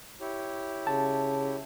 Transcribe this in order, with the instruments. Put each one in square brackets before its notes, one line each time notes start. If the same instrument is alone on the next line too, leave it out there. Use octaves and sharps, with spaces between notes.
[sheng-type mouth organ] E4 G4 C#5
[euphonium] C#3 [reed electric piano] A5